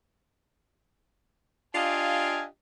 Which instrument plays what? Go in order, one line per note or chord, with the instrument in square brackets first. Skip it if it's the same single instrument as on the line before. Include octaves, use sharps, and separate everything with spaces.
[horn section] D4 F4 G4 D#5 F5 G#5